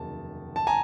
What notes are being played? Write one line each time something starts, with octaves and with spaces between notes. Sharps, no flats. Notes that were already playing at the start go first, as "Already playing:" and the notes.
Already playing: F1 D#2 C#3 F#3 A5
A5
G#5 A#5